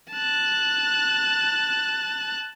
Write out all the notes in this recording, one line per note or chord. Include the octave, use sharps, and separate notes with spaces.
A5 F#6